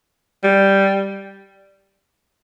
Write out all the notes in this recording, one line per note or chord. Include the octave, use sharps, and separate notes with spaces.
G3